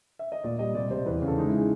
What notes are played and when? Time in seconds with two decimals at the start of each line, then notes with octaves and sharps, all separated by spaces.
0.19 E5
0.32 D#5
0.44 A#2 D5
0.59 G3 D#5
0.75 C3 D5
0.90 C3 C5
1.06 E2 B4
1.22 C#3
1.27 A4
1.38 G#3 D#4
1.48 E4
1.58 G#4